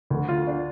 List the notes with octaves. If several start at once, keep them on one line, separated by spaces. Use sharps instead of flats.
D2 D3
F4
D4